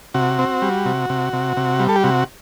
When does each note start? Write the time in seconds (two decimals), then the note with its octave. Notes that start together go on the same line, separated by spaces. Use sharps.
0.14 C3 F#4
0.39 C4
0.62 G3
0.86 C3
1.10 C3
1.33 C3
1.57 C3
1.80 G3
1.89 A4
1.96 G4
2.03 C3 F#4